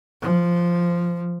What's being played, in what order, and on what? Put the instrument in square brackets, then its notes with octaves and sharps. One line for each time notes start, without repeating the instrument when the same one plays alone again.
[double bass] F3